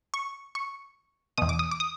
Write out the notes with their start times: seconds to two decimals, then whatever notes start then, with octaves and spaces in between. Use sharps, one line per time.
0.14 C#6
0.55 C#6
1.38 E2 B2 D#6
1.49 D6
1.59 D#6
1.71 D6
1.80 D#6